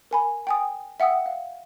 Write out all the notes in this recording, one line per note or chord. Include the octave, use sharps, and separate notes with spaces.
A#4 G#5 B5
G5 G#5 D#6
E5 F#5 G5 D#6 E6
F5